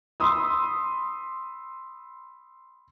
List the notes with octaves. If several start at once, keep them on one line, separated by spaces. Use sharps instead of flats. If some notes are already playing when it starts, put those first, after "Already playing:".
B5 C6 D#6 E6